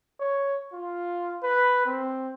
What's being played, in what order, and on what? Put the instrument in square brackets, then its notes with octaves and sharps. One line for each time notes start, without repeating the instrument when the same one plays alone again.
[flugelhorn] C#5
F4
B4
C4